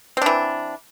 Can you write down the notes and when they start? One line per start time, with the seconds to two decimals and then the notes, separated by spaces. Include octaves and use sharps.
0.17 C4
0.22 D4
0.26 E3